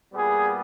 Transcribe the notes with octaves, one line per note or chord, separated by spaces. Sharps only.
A#2 G3 B3 G#4